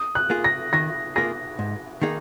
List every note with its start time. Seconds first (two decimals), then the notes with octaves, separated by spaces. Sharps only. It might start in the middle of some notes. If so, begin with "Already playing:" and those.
Already playing: D#6
0.15 F#6
0.30 A#3 F4 G#4
0.44 A#6
0.73 D#3 A#6
1.16 A#3 F4 G#4 A#6
1.59 G#2
2.02 D#3 A#3 D#4 G#4